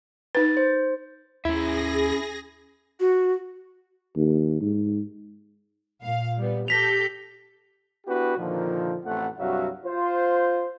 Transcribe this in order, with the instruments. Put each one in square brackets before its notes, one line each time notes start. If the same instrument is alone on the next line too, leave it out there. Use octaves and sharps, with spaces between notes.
[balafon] D#4 B4 [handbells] A6
[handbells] C5
[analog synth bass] D#2 [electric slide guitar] C#4 E5 [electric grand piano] E4 [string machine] G#4 A#6
[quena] F#4
[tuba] D#2
G#2
[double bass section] A#2 [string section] F5
[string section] G3 B3
[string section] G4 A4 G6 [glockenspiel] A#6 B6 F7
[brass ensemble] B3 D4 E4 F#4 G4 B4
A#2 D3 D#3 F3
A1 F2 A3 F#5
C2 G2 F#3 F#4 E5 F5
F4 C5